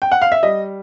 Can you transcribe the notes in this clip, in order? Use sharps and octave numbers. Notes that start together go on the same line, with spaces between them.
G5
F#5
F5
E5
G3 D#5